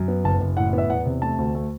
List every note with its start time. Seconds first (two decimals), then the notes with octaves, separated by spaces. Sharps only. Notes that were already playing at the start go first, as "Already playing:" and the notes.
Already playing: F#2
0.08 B3
0.24 F#1 A5
0.40 F#1
0.57 A2 F#5
0.73 B3
0.78 E5
0.90 E2 F#5
1.05 C3
1.22 A3 A5
1.38 D2
1.55 A3